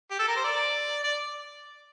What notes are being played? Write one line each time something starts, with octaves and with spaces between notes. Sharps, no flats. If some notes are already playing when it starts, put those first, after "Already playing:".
G4
A4
A#4
C5
D5
D5